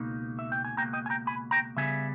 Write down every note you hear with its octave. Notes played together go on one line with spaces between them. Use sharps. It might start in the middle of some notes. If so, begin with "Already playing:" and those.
Already playing: C#2 B2 A#3 D#4
E5
G5
G#5
C#2 B2 A#3 G5 A#5
D#5 G5
G#5
G5 A#5
G#5 B5
G5 A#5
C#3 G3 B3 E5 G#5